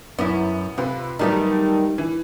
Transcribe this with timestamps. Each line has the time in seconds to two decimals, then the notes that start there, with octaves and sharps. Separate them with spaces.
0.19 F#2 B3 E4
0.78 C3 F4 B4
1.19 D#3 F#3 G3 A3 B3 D#4
1.98 E3